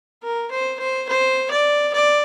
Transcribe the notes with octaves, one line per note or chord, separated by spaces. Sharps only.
A#4
C5
C5
C5
D5
D5